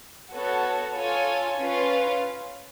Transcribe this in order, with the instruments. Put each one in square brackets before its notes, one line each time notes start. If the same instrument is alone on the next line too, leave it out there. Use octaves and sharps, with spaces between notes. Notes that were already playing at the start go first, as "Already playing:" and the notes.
[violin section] B3 F#4 A4 C#5
F4 A4 C#5 G#5
C#4 F4 B4